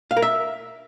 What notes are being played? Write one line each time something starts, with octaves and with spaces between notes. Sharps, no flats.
F5
A#4
E5